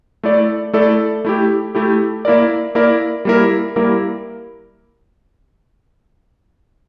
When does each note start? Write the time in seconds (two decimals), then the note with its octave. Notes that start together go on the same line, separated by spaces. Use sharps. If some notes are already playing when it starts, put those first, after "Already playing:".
0.23 A3 E4 A4 D5
0.73 A3 E4 A4 D5
1.25 A3 E4 G4
1.75 A3 E4 G4
2.25 A#3 E4 A#4 D5
2.75 A#3 E4 A#4 D5
3.25 G3 A#3 E4 A#4
3.76 G3 A#3 E4 A#4